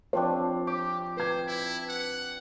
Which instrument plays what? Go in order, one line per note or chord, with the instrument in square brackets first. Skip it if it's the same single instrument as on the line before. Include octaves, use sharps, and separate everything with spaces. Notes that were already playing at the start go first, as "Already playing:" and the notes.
[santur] F3 C4 D4 [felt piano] C#5
[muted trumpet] G4 [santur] D6
[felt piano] B4 G#6 [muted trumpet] C5
[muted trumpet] E4
F#5